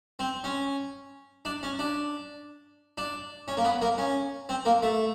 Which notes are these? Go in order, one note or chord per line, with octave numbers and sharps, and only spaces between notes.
C4
C#4
D4
C#4
D4
D4
C#4
A#3
B3
A#3
C#4
C4
A#3
A3